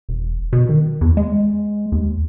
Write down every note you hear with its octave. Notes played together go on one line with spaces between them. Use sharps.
E1
B2
D#3
E2
G#3
D#2